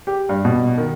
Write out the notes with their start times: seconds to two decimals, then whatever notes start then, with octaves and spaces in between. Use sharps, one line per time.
0.07 G4
0.29 G2
0.45 B2
0.78 D#3